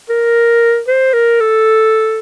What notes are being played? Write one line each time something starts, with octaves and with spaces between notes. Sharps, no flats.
A#4
C5
A#4
A4